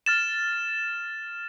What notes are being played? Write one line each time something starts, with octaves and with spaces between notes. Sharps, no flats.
F6 A6 E7